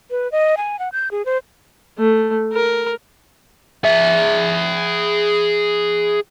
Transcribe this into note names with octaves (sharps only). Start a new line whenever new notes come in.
B4
D#5
G#5
F#5
G6
G#4
C5
A3
A#4
G#4 E5